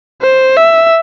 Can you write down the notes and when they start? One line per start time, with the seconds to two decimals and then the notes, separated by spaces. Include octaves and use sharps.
0.22 C5
0.57 E5